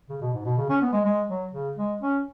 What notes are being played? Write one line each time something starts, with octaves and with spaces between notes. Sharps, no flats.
C#3
B2
G#2
B2
C#3
C#4
B3
G#3
G#3
F#3
C#3
G#3
C#4